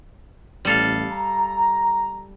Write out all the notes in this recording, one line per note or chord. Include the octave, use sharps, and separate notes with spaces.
A1 G3 A4 F5
A#5